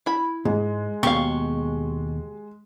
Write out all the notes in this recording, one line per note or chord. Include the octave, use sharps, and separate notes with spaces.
E4 B5
G#2 G#3
D#2 B2 G4 F5 C#6